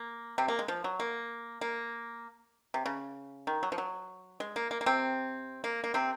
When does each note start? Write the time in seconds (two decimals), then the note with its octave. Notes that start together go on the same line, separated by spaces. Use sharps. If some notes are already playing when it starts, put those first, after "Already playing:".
Already playing: A#3
0.38 C3 C4
0.48 A#3
0.59 G#3
0.68 F3
0.84 F#3
1.00 A#3
1.61 A#3
2.74 C3
2.86 C#3
3.47 D#3
3.63 F#3
3.72 F3
3.78 F#3
4.40 G#3
4.56 A#3
4.71 A#3
4.81 A#3
4.86 C3 C4
5.64 A#3
5.84 A#3
5.94 C3 C4